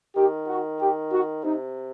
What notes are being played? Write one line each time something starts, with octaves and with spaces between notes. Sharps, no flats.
D#3 G4
F#4
G4
F#4
C3 D#4